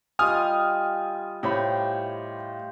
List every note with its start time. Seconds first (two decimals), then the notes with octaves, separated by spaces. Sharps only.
0.19 G3 F4 D#5 G#5 D#6 F6
1.43 A2 G4 C5 C#5 B5